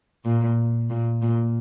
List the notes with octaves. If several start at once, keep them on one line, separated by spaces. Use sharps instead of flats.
A#2
A#2
A#2